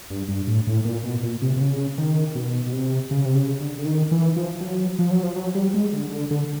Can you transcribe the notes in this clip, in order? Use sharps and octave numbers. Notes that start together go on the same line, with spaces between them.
G2
G2
A2
A2
A#2
B2
A#2
C3
C3
C#3
D#3
B2
B2
C3
C#3
C3
C#3
D3
D3
D#3
E3
F3
F#3
F3
F#3
F3
F#3
G3
G#3
D3
D3
D3